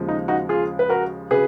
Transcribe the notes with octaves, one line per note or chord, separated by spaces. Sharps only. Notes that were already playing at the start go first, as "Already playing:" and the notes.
Already playing: D#2 C#3 F3 G#3
D#4
D#4 F#4
F4 G#4
B4
F#4 A#4
C#3 F#3 G#4 B4